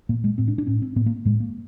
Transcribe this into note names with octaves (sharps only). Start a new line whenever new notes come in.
A#2 A#3
G#3
A2 C4
D4
D4
A2 C#4
C4
A2 B3
A#3
A2 G#3
A#3